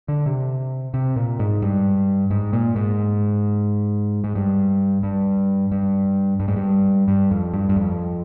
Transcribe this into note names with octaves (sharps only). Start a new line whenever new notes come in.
D3
C3
C3
A#2
G#2
G2
G#2
A#2
G#2
G#2
G2
G2
G2
G2
G#2
G2
G2
F2
G2
G2
F2